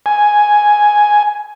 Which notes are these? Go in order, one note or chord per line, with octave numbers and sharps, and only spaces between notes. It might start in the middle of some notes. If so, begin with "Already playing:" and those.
G#5